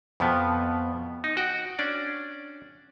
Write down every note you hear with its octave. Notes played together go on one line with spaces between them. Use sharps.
F2 B2 F3 B3
D#4
F#4 F#5 G5
C#4 D4 D5